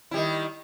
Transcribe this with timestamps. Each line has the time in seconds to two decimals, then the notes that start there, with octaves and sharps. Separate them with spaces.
0.11 E4
0.14 G3
0.17 D#3